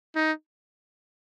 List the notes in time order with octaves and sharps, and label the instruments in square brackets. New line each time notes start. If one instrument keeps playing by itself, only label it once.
[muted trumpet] D#4